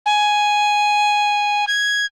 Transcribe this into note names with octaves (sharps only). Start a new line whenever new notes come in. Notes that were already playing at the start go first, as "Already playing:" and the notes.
G#5
G#6